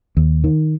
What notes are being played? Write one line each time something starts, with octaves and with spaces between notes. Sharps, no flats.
D#2
D#3